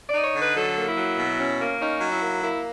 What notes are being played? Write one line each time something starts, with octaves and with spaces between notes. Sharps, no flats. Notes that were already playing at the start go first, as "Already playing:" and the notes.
D#4 D5
C#5
D3 B4
F#3 A4
A#3
E4
F#3
B2
C#4
A#3
C#4 D#4
F#3
E4
A#3
A#3 E4